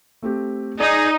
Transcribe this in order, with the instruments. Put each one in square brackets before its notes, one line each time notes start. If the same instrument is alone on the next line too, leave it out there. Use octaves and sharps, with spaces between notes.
[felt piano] A3 C4 G4
[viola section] D#4 [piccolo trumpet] G#4 [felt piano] D5